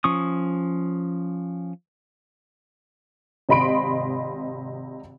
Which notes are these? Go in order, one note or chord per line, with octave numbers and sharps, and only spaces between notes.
F3 C#4 C#6 D#6
G#1 C3 D#5 B5 C6 D7